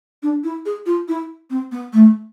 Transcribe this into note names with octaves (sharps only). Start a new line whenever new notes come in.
D4
E4
G#4
F4
E4
C4
B3
A3